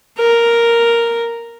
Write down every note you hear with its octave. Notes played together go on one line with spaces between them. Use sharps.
A#4